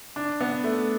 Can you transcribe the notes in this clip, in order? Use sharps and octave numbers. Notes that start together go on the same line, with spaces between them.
D4
B3
A3